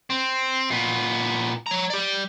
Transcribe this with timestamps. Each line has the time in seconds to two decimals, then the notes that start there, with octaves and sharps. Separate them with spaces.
0.10 C4
0.71 A#2 B3
1.67 C#5 A#5
1.90 G4 D5